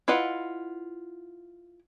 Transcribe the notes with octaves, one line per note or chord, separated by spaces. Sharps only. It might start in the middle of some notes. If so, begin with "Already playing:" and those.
E4 F4 B4 D#5 F#5